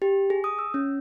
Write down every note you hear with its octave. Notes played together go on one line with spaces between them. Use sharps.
G4
G#4
D#6
E6
C#4